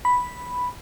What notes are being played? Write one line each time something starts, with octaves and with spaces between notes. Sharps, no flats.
B5